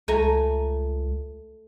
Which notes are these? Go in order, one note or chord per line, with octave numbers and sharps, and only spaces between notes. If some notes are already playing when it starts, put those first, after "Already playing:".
C#2 A3 G#5 A#5